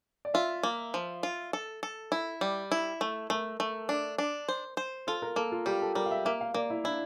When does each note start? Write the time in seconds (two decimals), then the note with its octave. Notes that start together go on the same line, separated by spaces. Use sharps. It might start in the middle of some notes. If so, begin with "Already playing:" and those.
0.25 D5
0.34 F4 E5
0.63 A#3
0.94 F3
1.23 F4
1.53 A4
1.83 A4
2.12 E4
2.41 G3
2.72 E4
3.01 A3
3.30 A3 A#4
3.60 A3
3.89 D4
4.18 D4
4.48 C5
4.77 C5
5.07 F4 A4
5.22 A#4
5.36 A#3 A4
5.52 F4
5.66 G3 G4
5.81 A4
5.95 G3 A#4
6.06 F5
6.11 E5
6.25 A#3 E5
6.41 F5
6.54 A#3 D5
6.70 E4
6.84 D4 E4